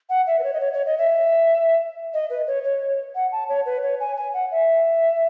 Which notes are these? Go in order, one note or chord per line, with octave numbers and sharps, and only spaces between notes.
F#5
E5
B4
C#5
D#5
C#5
C#5
D#5
E5
D#5
B4
C#5
C#5
F#5
A5
C#5
B4
C#5
G#5
G#5
F#5
E5